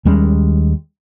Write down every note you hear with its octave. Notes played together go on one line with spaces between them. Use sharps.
D#2 G3 G#3 C#4